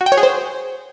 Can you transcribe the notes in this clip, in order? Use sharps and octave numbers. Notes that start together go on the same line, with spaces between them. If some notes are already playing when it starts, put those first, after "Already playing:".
F#4
G5
C#5
G#4
C5